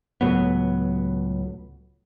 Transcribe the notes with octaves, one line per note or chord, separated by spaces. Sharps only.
C#2 A2 F#3 B3